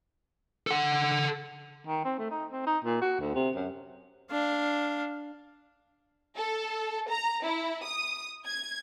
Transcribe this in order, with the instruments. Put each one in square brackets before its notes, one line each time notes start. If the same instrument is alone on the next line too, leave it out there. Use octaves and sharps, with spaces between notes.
[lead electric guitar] A4 F#5
[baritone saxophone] D#3
C4
A3
D#4
C4
D#4
A#2
F#4
D2
C3
F#2
[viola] D4 F5
[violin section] A4
A#5
E4
D#6
G#6